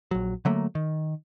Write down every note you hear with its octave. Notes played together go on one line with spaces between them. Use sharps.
A#1 F#3
D3 F#3 A3 A#3
D#3